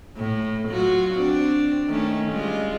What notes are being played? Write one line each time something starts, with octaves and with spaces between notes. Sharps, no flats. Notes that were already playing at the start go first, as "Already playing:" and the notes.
A2
F#3 F4 F#4
C4 D4
D#3 A3 C#4
G3 G#3 F4